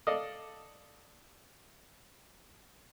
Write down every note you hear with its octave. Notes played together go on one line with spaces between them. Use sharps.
A4 D5 D#5 F5